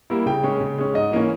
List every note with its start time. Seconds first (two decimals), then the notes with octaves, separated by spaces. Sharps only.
0.10 G3 A#3 E4
0.26 C#3 G5
0.43 G#3 C#4
0.60 C#3
0.78 G#3 C#4
0.94 G#2 D#5
1.12 E3 A#3 C#4